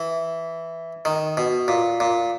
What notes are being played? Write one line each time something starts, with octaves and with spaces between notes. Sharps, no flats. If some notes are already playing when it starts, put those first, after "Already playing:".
Already playing: E3
D#3
B2
A#2
A#2